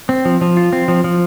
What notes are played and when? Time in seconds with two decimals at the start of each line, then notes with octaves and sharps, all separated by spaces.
0.09 C4
0.25 F3
0.41 F3
0.57 F4
0.73 C4
0.88 F3
1.04 F3